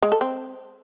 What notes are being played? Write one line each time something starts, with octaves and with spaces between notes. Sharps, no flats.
G#3
A4
C4